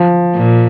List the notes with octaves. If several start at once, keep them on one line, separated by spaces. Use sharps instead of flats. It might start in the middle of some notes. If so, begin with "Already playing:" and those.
Already playing: F3
A#2